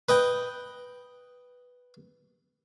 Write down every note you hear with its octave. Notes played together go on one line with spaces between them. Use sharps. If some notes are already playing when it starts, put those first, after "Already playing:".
B4 D#5 G5